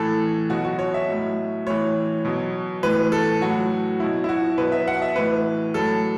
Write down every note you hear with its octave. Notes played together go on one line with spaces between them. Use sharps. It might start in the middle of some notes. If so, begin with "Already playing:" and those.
Already playing: A2 E3 A4
B2 F#3 F#4
F#4
C#5
E5
A2 F#3
A2 E3 C#5
B2 F#3
A2 E3 B4
A4
A2 F#3 F#4
B2 F#3 E4
E4
F#4
B2 F#3 B4
E5
F#5
E5
A2 E3 B4
A2 F#3 A4